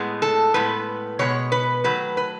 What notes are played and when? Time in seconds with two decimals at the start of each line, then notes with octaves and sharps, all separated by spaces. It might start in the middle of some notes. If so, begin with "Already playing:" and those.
Already playing: A2 G#3 B3
0.22 A4
0.54 A2 G#3 B3 B4
1.19 B2 G#3 B3 C#5
1.52 B4
1.84 D#3 F#3 A3 B4
2.17 B4